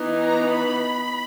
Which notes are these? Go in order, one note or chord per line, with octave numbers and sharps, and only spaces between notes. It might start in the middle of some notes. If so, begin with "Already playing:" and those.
Already playing: E3 B3 D#4
A#5
B5